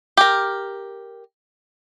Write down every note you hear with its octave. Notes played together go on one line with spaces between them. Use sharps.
G4 A#4